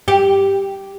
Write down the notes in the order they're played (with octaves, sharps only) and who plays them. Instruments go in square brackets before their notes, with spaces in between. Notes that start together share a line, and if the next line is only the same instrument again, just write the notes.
[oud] G4